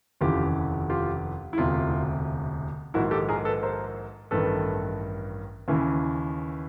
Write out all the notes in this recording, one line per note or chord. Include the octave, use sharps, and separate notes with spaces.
F1 D#2 C#3 E3 F4 G4
F4 G4
E4
E1 D2 C3 F4
A#1 G#2 D#3 E4 F#4
G4 A4
G#4 A#4
A4 B4
A#4 C5
A1 G2 D#3 A4 B4
D#2 C#3 E3